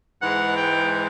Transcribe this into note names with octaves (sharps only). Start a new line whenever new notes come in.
G#2 E3 G#3 F#5
G5